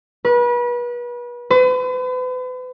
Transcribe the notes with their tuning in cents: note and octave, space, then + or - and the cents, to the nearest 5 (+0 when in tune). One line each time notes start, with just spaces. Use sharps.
B4 -35
B4 +40